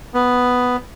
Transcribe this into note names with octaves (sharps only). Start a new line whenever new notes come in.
B3